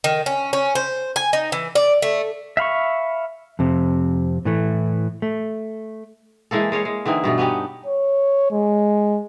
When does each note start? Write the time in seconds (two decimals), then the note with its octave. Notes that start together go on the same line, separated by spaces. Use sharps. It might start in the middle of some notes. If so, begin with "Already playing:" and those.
0.04 D#3
0.26 C#4
0.53 C#4
0.75 C5
1.16 G#5
1.33 D#4
1.52 E3
1.75 D5
2.02 A3
2.57 E5 F5 B5 C#6
3.59 F2 C3
4.45 A2 E3 A3
5.22 A3
6.51 E3 G#3 A#3 A4
6.72 G#3 C#5 F5
6.85 G#3
7.06 D3 E3 C4 D#4
7.24 G2 B2 A3
7.38 B3 C#4 D#4 G4
7.86 C#5
8.51 G#3